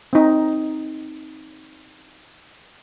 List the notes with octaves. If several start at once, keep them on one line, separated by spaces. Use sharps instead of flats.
C4 D#4